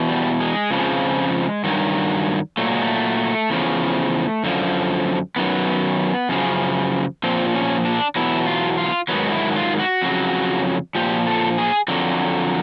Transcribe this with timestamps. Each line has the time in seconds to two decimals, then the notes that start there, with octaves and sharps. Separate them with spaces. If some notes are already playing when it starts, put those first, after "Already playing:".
Already playing: E2 B2
0.09 G3
0.40 G#3
0.71 F2 C#3 F3
1.64 G2 D#3 F#3
2.57 A#2 F#3 A3
2.70 G#3
2.82 A3
3.50 E2 C#3 F3
4.44 F#2 D3 F3
5.36 F#2 D#3 F#3 B3
6.29 F#2 C#3 F3
7.23 A#2 F3 C4
7.55 C#4
7.85 D4
8.15 E2 B2 F#3 E4
8.46 F4
8.78 F4
9.09 G#2 D#3 F#3 B3
9.32 E4
9.56 F4
9.79 F#4
10.02 F2 C#3 F#3
10.95 A#2 F3 G4
11.27 A4
11.58 G#4
11.88 F2 D3 F#3